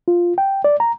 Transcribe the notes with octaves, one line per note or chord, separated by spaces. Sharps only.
F4
G5
D5
A#5